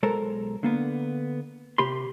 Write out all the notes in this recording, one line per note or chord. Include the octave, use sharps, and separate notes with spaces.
B1 G#3 A4 A#4 C5 A#5
D3 A#3 B3
C3 G4 B5 C6